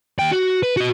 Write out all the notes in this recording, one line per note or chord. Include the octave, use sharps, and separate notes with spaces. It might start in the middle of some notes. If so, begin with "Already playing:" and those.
D#2 G5
F#4
B4
F#4 D#5